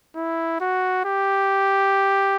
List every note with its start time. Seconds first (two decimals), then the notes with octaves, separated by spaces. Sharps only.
0.15 E4
0.60 F#4
1.05 G4